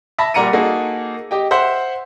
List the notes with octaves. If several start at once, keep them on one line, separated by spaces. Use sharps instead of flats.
E5 A5 B5 A#6
A#2 G3 F#5 A#5 C#7 D#7
A#3 D#4 F#4 G#4 A4
G4 D#5 G5
C5 E5 F#5 C6